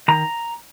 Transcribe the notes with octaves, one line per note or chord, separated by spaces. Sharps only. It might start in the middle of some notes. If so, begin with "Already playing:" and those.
D#3 A#5